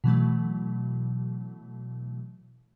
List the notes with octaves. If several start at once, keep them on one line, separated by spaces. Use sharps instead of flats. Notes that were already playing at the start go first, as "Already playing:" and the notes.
B2 E3 F#3 A3